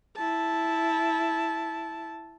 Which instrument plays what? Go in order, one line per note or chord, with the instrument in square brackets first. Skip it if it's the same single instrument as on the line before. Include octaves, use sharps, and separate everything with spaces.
[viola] E4 A5